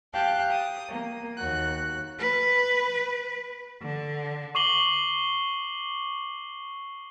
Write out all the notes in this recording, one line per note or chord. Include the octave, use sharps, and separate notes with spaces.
G4 F5 G5 A5 F#6
D#6
A#3
D#2 F#4 F#6
B4
D3
C#6 D6 C7 F#7 G7